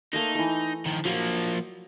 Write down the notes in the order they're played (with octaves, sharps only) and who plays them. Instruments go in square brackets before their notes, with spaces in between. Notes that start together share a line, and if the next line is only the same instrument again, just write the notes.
[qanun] A3 A#3 C5 [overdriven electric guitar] D#4
[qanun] E3 A3
[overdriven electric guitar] D#3 F3
[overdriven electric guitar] F3 A#3 [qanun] F#3 C6